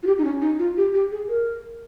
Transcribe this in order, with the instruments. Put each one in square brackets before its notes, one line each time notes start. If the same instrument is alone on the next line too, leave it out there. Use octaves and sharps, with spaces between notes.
[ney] F4
G4
D#4
C#4
D#4
F4
G4
G4
G#4
A#4